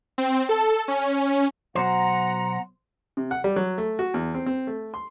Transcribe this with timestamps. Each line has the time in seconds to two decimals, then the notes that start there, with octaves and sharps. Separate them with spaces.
0.18 C4
0.49 A4
0.88 C#4
1.75 B2 F#3 C5 F#5 A#5
3.17 C3
3.31 F#5
3.44 G3
3.56 F#3
3.78 A3
3.99 F#4
4.14 E2
4.34 C4
4.46 C4
4.67 A3
4.94 C6